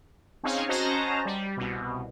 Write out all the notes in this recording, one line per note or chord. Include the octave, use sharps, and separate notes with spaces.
C4 C#4 D#4 G#4 C#5 F5
C#4 F#4 C5 D#5 A5 A#5
G3
C2 B2